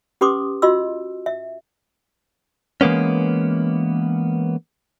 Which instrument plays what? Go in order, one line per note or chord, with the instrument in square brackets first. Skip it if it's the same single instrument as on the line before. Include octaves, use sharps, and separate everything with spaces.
[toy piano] C#4 G4 B4 C6 D6 D#6
F4 F#4 D#5 C6 E6
E5
[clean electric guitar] E3 G#3 A#3 B3 C#4